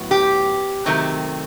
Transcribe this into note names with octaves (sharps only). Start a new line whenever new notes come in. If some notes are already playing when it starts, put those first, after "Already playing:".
Already playing: A2 F#3 B3
G4
C3 D#3 F#3 A3 C4